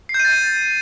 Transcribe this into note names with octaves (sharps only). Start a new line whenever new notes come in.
C7
G6
D#7
A6